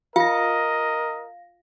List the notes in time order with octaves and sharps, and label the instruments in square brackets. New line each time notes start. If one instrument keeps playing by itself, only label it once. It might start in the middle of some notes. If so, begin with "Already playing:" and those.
[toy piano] F4 [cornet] A#4 [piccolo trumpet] D#5 [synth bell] F5 A#6